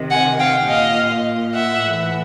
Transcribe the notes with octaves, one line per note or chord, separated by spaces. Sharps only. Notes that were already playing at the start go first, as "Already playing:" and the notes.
Already playing: C3 D#3
F#5 G#5
F5 G5
A#2 D#5 F5
E5 F#5
A2 E3